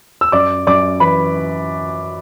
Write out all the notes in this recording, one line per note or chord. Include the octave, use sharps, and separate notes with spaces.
E6
F#2 D5 D6
F#2 D5 D6
E3 B4 B5